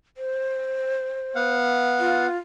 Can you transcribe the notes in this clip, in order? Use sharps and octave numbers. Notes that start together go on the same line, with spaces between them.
C5
B3 F5 F#5
F4